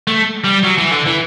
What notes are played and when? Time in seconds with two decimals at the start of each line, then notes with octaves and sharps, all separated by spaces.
0.07 A3
0.45 G3
0.64 F#3
0.78 E3
0.91 D3
1.06 E3